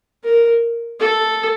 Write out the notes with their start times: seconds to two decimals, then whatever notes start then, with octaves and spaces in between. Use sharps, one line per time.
0.24 A#4
1.00 A4